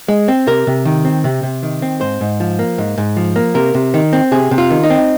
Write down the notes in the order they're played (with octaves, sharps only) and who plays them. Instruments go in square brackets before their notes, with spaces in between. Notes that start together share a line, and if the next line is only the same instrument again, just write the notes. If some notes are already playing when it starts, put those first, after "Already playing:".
[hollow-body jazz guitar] G#3
C4
C3 A#4
C3
D#3
C4
C3
C3
D#3
C4
G#2 C5
G#2
F3
A#3
G#2
G#2
F3
A#3
C3 A#4
C3
D#3
C4
C3 G#4
C3
F4
D#3
D#4
C4